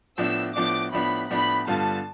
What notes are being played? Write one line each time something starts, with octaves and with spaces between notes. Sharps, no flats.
A2 F3 B3 D4 E6
A2 F3 B3 D4 D6
A2 F3 B3 D4 B5
A2 F3 B3 D4 B5
G2 D3 G3 B3 F4 A5